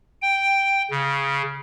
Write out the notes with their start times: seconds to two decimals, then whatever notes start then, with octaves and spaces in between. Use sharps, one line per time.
0.22 G5
0.91 C#3